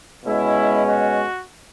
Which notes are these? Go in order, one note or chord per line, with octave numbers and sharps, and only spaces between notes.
B2 G#3 C#4 E4
F#4